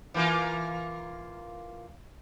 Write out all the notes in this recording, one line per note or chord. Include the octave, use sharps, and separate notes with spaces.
E3 A#3 F4